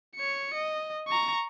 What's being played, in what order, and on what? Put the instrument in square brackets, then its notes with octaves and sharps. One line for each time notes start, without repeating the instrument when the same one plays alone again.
[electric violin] C#5 C#7
D#5
A#5 C#6